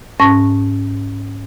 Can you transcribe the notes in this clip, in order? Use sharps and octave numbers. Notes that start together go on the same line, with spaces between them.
G#2 C#4 A5 C#6 A#6